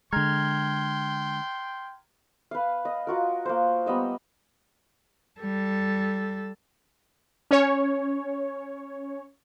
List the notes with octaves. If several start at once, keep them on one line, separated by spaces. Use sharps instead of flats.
D3 G#3 G5 A#5 C6 F6 G#6
B4 F5
D#5
F4 F#4 A#4
A#3 C5
G3 B3 D#5 E6
G3 A4
C#4 C#5